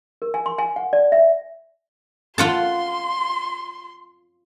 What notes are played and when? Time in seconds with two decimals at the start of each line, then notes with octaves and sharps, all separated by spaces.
0.22 A#4
0.34 G#5
0.46 C6
0.58 G#5
0.76 F#5
0.93 D5
1.12 E5
2.38 F4 F#5 A5 C6